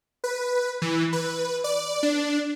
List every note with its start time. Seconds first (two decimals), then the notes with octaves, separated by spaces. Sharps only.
0.24 B4
0.82 E3
1.13 B4
1.64 D5
2.03 D4